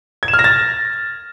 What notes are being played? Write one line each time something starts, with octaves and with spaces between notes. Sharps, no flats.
G#6
E7
F6
A#6
A6